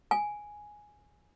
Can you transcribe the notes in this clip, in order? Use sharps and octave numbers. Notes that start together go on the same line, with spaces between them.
G#5